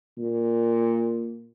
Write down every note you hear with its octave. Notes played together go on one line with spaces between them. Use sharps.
A#2